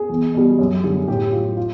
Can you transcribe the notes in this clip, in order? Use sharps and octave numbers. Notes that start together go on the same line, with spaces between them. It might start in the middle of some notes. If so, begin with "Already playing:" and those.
Already playing: G#4
E2
B2 G3
F#2
D3 G3
A2 G4
F#3 F4
F4